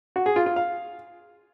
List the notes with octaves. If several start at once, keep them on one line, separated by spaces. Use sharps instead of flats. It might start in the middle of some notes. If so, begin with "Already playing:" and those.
F#4
G#4
F4
F4
F5